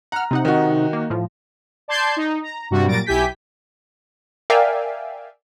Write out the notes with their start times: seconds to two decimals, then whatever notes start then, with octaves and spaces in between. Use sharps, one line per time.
0.12 F#5 A#5 F6
0.31 C3 D#4 F#5
0.45 D#3 F#4
0.93 A#3
1.10 A2 F3
1.88 D5 A5 C6 G6 G#6 C7
2.17 D#4
2.42 A#5
2.71 G2 C3 G3 F#4
2.88 A#2 F#3 G3 A6 A#6 D7
3.06 B1 E4 G4 G#5 G6 B6
4.50 A#4 D5 E5 F5 G5 G#5